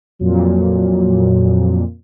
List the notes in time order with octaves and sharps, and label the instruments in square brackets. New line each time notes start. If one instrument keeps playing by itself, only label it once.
[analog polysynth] F2 A#2 [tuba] F#3